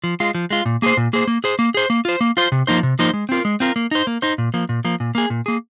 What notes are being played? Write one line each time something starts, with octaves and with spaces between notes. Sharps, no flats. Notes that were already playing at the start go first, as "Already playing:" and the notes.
F3
G#3 F4
F3
G#3 F4
A#2
A#3 G#4 C5
A#2
A#3 G#4 C5
A#3
G#4 C5
A#3
G#4 C5
A#3
F4 C5
A#3
F4 C5
C3
F3 A#3 D#4 C5
C3
F3 A#3 D#4 C5
G#3
C4 F4 A#4
G#3
C4 F4 A#4
A#3
D#4 C5
A#3
D#4 C5
A#2
F3 A#3
A#2
F3 A#3
A#2
A#3 G#4
A#2
A#3 G#4